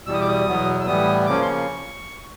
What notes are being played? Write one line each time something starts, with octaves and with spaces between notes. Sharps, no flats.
E2 B2 G3 E6
D#6
D6
D#6
E2 B2 F#3 B3
E6
A2 E3 G3 B3 D#6
C#3 F3 A#3 C#4 D6
C6
C#6